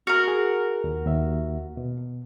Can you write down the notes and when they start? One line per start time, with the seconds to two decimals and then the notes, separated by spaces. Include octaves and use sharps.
0.07 F#4 A#4 F6
0.28 G#4
0.84 D#2
1.06 D#2 E5
1.77 B2